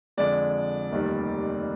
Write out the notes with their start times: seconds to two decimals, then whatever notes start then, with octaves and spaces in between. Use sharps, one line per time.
0.17 F2 D3 G#3 D5
0.92 F1 D#2 D#3 G3